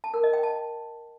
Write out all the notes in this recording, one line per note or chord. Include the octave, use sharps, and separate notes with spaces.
A5
A#4
D#5
G5
A5